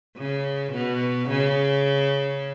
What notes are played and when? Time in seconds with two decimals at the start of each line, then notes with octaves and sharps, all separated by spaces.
0.18 C#3
0.73 B2
1.29 C#3